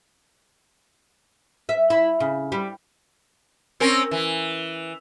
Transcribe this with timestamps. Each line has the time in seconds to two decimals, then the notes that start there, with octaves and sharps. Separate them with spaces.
1.69 E5
1.90 E4
2.20 C#3
2.52 G3
3.80 C4 C#4 A#4
4.11 E3